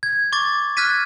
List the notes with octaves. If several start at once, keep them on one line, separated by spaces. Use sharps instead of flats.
G#6
C#6 D6 G#6 A6
F6 F#6 G#6 A6 B6 D#7